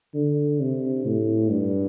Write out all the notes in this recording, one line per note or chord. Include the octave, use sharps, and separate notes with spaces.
D3
C3
A2
G2